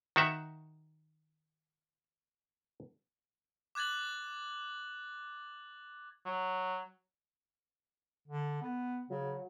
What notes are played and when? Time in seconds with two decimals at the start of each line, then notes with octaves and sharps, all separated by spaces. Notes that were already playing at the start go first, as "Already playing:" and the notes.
0.16 D#3 F#4 E5
3.75 D6 F#6 G#6 A6 F#7
6.26 F#3
8.28 D3
8.62 B3
9.10 C#3 F#3